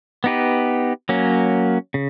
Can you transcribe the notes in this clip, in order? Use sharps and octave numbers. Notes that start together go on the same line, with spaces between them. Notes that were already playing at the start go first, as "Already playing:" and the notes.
B3 D#4 G4 B4
F#3 A#3 C#4
C#3